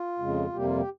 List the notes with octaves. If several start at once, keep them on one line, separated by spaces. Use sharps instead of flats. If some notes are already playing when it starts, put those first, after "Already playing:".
Already playing: F4
F2 C#3 G#3
F2 C3 G3 A#3 G4
F4
G4